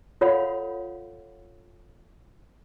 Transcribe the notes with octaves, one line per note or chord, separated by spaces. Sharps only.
F4 A4 C#5 F5 F#5 B5